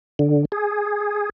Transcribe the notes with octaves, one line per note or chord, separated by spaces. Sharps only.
D3
G#4